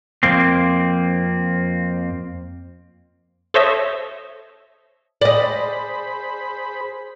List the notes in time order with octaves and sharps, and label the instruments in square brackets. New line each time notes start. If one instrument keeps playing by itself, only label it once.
[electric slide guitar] F2 A#3 C4
[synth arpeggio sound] A4 C5 C#5 D#5 E5
[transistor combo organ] G#4 C5 B5 [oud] D5 D#5